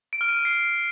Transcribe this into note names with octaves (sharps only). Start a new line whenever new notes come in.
D7
F6
D#7
D7
C7